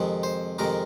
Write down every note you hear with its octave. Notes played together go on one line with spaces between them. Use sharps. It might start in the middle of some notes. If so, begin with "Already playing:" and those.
Already playing: F2 C3 D#3 G#3
C5
F2 C3 D#3 G#3 A#4